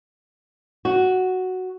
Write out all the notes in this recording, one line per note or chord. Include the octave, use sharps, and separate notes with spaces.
F#4